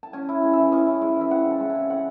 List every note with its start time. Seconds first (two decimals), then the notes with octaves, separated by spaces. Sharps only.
0.03 A5
0.13 C#4 G#5
0.29 E4
0.43 G#3
0.53 E3 E5
0.72 C#4 D#5
0.87 E4
1.02 G#3
1.16 E3 E5
1.31 C4 F#5
1.45 C#3
1.51 A5
1.60 G#3
1.70 G#5
1.75 C#3
1.90 C4 F#5